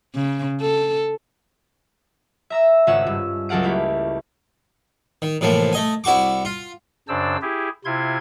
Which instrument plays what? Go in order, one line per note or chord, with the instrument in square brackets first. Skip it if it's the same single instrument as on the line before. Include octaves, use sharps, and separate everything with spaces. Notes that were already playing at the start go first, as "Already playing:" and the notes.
[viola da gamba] C#3
A4
[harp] E5 A#5 E6
G#1 C#3 C#4 F4 F#5 E6
G2
C#2 F#3 A4 F5 F#5 D7
A3 A#3 E4 G4
[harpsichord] D#3
A2 C3 E3 F3 A#3
A3 D#5 G#5
C2 E4 F#4 C#6 D6
F4
[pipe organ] F#2 C#3 D4 C5 D5 E6
E4 G4 G#4
C3 E4 F4 C6 G#6